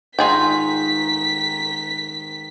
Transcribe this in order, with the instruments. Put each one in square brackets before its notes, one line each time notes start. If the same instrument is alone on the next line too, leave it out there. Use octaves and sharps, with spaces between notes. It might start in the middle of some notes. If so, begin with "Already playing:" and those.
[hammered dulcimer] G#2 D#3 D#4 [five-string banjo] F4 G#4 G5 [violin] B6